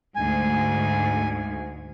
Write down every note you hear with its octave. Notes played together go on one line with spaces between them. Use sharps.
D2 G#2 G#5